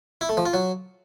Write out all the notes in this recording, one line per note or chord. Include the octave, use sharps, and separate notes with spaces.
E4
A3
F3
F4
F#3